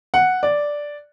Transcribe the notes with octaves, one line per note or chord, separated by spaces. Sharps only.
F#5
D5